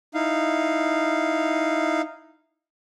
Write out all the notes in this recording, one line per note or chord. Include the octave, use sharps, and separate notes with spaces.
D#4 E4 F5